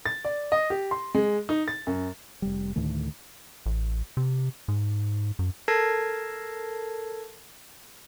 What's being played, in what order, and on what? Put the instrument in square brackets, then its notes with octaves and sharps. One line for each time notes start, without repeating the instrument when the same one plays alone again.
[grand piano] A6
D5
D#5
G4
C6
G#3
D#4
A6
F#2
[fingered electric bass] F1 G3
D2 A2 D#3 A3
[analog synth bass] A1
C3
G#2
F#2
[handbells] A4 A#4 A5 G#6 A#6 C7